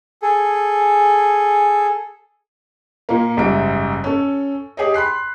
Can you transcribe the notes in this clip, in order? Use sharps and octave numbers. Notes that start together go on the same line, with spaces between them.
G#4 A4
A#2 A#3
F#1 G#2 G3 E5 D7
C#4 A4
G4 G#4 C#5 D#5
B5 C6 F#6 C7